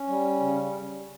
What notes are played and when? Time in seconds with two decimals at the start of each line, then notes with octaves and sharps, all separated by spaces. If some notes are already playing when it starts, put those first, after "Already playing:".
Already playing: C#4
0.08 G3
0.40 C#3